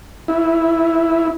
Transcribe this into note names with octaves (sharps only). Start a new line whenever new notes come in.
E4